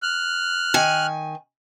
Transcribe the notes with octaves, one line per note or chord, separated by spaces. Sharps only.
F6 F#6
D#3 G#5